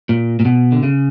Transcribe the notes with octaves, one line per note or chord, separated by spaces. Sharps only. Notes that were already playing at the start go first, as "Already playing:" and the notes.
A#2
A#2
B2
D3
C#3